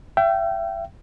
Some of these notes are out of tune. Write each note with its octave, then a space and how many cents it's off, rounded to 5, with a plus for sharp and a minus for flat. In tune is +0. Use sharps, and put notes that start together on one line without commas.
E5 +35 G5 -20